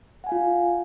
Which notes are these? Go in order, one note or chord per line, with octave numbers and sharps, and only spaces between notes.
F4 F5 F#5 G#5